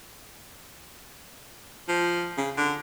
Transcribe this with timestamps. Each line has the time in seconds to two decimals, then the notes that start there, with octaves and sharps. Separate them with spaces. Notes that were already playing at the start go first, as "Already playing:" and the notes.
1.88 F3
2.37 C#3
2.57 D3